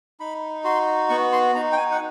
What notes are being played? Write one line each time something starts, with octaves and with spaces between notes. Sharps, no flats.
D#4 B5
F#4 C6
B3 C#6
C6
D#4 A#5
G5
G#5
F#5